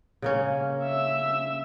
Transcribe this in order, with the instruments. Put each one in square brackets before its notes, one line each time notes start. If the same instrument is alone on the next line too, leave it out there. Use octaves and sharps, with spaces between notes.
[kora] C#3 A#3 C#4
[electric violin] E5 E6